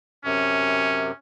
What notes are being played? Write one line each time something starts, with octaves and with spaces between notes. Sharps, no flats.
F#2 C3 C#4